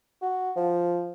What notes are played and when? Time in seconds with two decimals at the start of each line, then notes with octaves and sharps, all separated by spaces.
0.22 F#4
0.56 F3